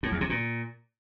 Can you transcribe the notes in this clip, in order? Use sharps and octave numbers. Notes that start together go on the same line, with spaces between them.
A2
E2
C3
A#2